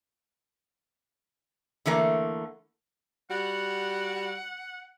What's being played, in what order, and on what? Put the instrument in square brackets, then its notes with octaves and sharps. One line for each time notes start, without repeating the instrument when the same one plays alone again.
[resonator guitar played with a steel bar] D3 E3 A3 A#3
[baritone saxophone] G3 [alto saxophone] F#4 [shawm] F#5